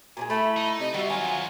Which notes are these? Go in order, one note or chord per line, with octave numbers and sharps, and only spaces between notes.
A#2 F3 G#3
A3 E4 A4 B5
D#4
C3 D#5
D#2 G3 F4 F#4 E5
F3 F#3 F5 G#5